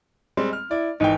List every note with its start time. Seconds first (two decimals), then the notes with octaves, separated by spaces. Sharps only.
0.37 G3 G#3 C4
0.53 F6
0.71 E4 D5
1.00 G#1 E3 D#4 G5